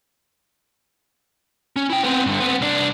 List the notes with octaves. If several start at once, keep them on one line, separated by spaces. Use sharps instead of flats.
C#4
E4 G5
B3 C4
G2 D3
B3 C4
C2 D4